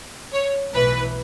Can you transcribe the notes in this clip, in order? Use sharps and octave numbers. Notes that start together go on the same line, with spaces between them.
C#5
B1 A2 E3 B4